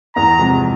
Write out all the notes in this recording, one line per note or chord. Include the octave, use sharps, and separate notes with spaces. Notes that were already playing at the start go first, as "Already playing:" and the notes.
E2 A#5
C3 F3 G#3